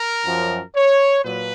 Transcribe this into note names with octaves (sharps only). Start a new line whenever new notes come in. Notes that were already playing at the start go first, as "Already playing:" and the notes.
Already playing: A#4
F#2 F3
C#5
A#2 F#3 B4